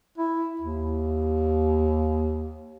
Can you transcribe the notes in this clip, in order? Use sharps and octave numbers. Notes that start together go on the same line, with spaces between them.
E4
D#2